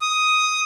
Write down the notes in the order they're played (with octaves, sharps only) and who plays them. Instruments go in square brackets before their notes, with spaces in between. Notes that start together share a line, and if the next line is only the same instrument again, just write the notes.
[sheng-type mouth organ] D#6